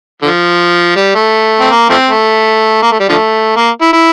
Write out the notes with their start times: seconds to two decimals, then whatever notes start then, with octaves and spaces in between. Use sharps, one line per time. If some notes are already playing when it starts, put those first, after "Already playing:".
0.22 D3 F3
0.96 G3
1.15 A3
1.60 C4
1.71 A#3
1.90 F3 A3 C4
2.08 A3
2.82 A#3
2.91 A3
3.00 G3
3.09 D3 F3 A3
3.56 A#3
3.81 E4
3.93 E4